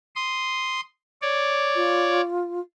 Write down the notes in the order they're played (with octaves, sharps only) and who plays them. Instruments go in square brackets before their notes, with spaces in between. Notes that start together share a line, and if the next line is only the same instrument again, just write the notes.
[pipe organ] C6 D#6
C#5 D5
[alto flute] F4